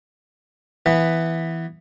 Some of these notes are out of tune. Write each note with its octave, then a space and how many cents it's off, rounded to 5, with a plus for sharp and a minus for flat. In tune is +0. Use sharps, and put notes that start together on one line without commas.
E3 +0 B3 +0